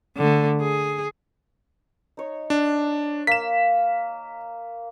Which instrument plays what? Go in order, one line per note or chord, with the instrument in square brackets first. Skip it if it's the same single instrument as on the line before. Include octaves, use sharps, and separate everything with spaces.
[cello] D3 A3
G#4
[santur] D#4 C#5
[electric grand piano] D4
[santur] A#3 [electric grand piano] B6 E7